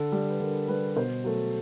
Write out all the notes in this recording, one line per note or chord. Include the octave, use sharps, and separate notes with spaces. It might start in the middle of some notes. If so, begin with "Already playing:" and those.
Already playing: D3 A4
G3
B4
D3 A#4
G3 B4
B2 C5
F#3 A3